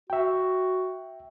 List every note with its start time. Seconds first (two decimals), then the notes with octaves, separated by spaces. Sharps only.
0.10 F#4 E5 G5